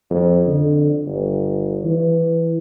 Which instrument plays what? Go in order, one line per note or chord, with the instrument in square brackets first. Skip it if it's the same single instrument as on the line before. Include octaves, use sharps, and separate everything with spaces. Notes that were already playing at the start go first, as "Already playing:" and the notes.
[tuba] F2
D3
G1
E3